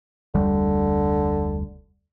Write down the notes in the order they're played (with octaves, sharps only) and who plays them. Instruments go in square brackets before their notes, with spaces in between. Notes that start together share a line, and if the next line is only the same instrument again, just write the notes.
[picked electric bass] F1 D2 G3 [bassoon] D3